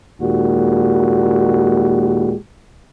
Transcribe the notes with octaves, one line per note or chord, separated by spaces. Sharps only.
D#2 A#2 G#3 F#4 G4